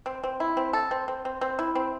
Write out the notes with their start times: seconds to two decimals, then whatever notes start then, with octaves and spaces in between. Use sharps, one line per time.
0.06 C4
0.24 C4
0.40 E4
0.57 C4
0.73 A4
0.91 C4
1.08 C4
1.25 C4
1.41 C4
1.59 E4
1.75 C4